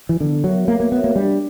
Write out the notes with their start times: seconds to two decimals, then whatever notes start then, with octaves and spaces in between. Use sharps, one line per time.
0.09 E3
0.20 D3 B3
0.44 F#3 F#4 A#4 C#5 E5
0.68 A#3 B3
0.80 A#3
0.92 B3 F#4 A#4 C#5 E5
1.04 A#3
1.16 G3 D4